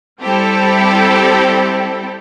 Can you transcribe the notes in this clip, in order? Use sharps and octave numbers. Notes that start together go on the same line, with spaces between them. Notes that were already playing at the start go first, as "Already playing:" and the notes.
G3 C4 E4 G4 A4